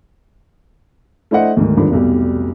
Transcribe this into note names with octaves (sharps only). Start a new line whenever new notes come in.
A3 D4 E4 C5 D#5 F#5
D2 G#2 D#3
E2 G2 D3 D#3 F3
F1 B1 G3